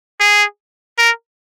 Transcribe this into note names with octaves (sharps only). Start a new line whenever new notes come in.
G#4
A#4